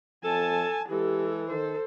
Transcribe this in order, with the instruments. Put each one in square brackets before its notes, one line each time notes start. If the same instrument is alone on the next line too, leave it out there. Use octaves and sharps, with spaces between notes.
[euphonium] F2 [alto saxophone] A4 [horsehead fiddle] G#5 A5
[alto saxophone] E3 [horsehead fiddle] G#3 A4 [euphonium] G4
[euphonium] D#3 [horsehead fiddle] A4 C5